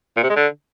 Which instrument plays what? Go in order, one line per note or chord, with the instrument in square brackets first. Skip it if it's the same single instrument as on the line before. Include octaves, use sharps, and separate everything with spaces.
[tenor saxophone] A#2
C3
G#3
D3